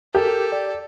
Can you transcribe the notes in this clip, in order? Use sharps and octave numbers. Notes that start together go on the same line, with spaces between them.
G4 A4 A#4
D5